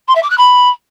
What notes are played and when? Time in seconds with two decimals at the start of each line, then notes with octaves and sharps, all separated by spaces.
0.07 C6
0.15 E5
0.22 D6
0.30 F#6
0.37 B5